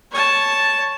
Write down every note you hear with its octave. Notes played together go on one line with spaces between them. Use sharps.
C#5 A5